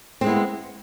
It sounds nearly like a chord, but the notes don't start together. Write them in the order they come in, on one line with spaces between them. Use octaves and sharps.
C4 G#3 E4 B3